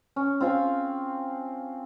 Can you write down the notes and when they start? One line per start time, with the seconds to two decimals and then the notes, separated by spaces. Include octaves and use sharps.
0.16 C#4
0.40 C4 F4 F5 G#5